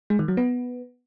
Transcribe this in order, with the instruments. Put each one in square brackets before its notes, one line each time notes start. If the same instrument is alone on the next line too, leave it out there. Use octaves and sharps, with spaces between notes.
[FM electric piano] G#3
D#3
F#3
B3